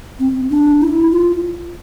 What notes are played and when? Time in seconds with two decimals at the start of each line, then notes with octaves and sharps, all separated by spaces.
0.20 C4
0.50 D4
0.81 E4
1.12 F4